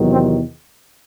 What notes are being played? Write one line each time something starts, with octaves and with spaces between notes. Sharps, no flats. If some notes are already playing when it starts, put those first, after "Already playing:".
Already playing: E2 C3 D#3 F#3
C4